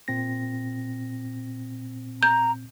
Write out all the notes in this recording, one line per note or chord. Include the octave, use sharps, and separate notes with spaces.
A#2 C4 A#6
A#5 G6